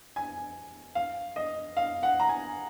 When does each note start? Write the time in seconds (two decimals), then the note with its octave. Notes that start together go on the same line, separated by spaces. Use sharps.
0.16 G#5
0.95 F5
1.36 D#5
1.77 F5
2.03 F#5
2.20 A#5
2.29 G#5